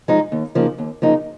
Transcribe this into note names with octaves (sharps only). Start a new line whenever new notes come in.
F3 G#3 D#4
D#2
C#3 F3 A#3 D#4
D#2
C#3 F3 A#3 D#4